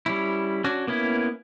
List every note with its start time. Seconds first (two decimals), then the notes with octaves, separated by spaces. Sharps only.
0.06 G3 C#4 E4
0.64 C#4 D4 F#4
0.87 A#3 B3 C#4 E4